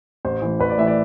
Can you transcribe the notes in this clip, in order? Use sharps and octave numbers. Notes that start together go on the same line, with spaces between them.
A1 C5
A2 E3
A1 B4
D5
A2 E3 E5
D5